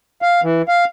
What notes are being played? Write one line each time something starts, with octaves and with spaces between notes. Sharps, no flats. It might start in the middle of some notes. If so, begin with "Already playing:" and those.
F5
E3
F5